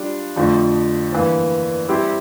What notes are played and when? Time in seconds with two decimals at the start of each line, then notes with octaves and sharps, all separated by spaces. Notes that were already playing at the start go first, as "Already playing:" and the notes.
Already playing: G3 D4 F4
0.36 F2 D3 F3 A3
1.12 G2 E3 A#3
1.89 G3 C4 E4 G4 C5